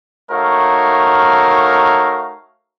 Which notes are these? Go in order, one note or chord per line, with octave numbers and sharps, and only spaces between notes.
A3 D#4 F#4 A#4 C#5 F5